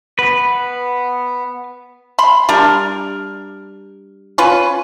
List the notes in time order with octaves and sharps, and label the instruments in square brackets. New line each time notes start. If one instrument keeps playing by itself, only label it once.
[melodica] B3 [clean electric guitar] B4
[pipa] B5 C6
G3 D4 A#4
C#4 F4 B4